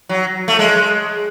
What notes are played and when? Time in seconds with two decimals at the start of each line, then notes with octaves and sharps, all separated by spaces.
0.09 F#3
0.48 A3
0.59 G#3